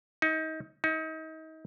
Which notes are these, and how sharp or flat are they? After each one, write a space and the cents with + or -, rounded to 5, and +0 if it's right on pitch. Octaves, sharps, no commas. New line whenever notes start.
D#4 +30
D#4 +35